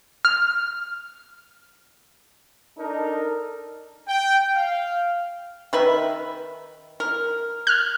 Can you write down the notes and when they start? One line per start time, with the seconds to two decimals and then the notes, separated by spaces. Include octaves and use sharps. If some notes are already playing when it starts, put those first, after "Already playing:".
0.25 F6
2.79 D4 D#4 A4 A#4
4.09 G5
4.55 F5
5.73 D#3 B4 E5
7.00 A#4
7.67 F6 F#6